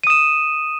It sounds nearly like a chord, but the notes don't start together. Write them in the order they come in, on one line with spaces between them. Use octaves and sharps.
D#7 D#6 E7